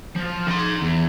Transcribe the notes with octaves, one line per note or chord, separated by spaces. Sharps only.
F3
D#4 C6
E2